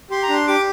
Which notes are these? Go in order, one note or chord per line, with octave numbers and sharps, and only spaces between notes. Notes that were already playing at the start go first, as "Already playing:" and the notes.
G4 C6
A#5
D4 C6
G4 D6